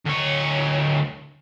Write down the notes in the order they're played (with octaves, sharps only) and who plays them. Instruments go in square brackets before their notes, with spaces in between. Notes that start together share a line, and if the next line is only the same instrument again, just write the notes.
[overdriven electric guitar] D2 C#5